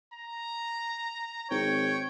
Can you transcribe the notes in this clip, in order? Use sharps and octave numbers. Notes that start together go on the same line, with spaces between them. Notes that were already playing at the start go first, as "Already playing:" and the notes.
A#5
G#1 C#5 G5